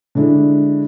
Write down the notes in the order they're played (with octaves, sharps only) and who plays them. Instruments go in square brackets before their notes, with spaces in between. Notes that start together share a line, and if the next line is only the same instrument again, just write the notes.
[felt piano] D3 G#3 D4 E4